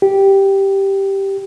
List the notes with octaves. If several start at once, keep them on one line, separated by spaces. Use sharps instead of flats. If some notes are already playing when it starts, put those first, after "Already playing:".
G4